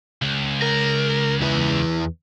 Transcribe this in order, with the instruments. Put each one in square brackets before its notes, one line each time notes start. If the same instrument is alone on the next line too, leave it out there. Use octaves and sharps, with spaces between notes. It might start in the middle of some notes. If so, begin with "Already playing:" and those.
[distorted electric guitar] C#2
[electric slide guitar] A#4
E2 E4 B4